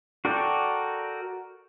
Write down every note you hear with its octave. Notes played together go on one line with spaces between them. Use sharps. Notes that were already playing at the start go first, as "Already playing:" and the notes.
F#4 A4 A#4 D5 G5